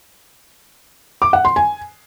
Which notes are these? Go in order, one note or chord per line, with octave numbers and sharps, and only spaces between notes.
D6
F#5
C6
G#5